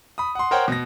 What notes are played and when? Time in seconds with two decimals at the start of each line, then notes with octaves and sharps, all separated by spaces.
0.18 B5 D#6
0.35 F#5 C6
0.51 A#4 C5 C#5 F#5 G5
0.68 B2 A#6